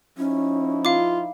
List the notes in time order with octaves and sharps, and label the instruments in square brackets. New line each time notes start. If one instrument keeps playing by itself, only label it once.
[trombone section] F3 D#4 E4 [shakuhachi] C#4
[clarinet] F4 [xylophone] F5 D6